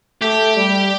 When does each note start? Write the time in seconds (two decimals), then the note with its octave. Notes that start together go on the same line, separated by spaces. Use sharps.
0.22 A3 G4
0.56 G3